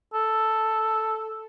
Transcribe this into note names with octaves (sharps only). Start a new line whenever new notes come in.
A4